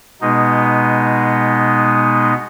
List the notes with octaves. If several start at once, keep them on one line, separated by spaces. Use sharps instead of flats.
B2 G#3 B3 D#4